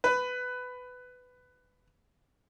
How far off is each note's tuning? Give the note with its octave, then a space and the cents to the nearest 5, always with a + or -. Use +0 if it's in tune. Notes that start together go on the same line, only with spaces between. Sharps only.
B4 +15